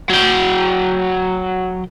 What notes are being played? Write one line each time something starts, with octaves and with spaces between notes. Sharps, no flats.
F#3 G5